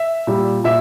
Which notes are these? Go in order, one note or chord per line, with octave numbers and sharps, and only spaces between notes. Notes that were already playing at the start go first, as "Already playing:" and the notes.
Already playing: E5
A#2 G3
A#2 E5